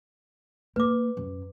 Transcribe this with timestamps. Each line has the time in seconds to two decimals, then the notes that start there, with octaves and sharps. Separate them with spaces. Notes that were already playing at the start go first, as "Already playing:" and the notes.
0.76 A#3 B4 D6
1.17 F#2